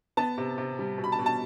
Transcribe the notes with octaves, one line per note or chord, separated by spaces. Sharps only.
B3 A5
C3
C3
G3
B2
B5
A5
B2
A5